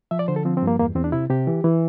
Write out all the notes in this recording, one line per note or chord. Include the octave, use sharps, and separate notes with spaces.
F3 E5
D5
D3 C5
A4
F3 C4
C4
G2 A#3
E2 A#3
E2 C4
D4
C3 E4
C3 G4
E3
E3